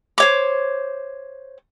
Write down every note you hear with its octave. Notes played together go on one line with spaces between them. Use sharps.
C5 C#5 D6